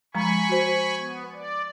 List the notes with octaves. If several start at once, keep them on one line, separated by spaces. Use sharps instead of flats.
F3 G#3 G#5 A#5 B5 C#6
F#4 C5
B3
D5